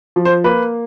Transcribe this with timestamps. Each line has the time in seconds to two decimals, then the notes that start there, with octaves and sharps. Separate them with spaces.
0.16 F3
0.25 C5
0.44 A#3 B4